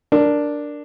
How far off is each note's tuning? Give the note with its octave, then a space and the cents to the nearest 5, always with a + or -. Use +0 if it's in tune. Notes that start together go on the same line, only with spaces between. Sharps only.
D4 +0 A#4 +0